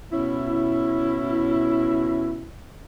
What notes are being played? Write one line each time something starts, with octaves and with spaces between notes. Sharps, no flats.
B2 C#4 E4